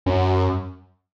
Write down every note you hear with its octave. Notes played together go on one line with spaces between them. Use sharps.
F#2